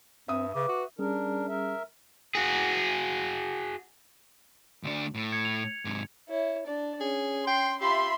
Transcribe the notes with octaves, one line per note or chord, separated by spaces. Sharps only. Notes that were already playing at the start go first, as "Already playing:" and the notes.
G2 C4 E5 D#6
C#3 B4 D6
F#4
G3 C#4 D4 G#4 A#4
A#4 E5
F#4 G#4
D2 D4
A2
G#6 C#7
F7
G#2 C3
E4 C#5
D4 D5
C#4 G#4
G5 C6
F4 G4 E5 B5 C6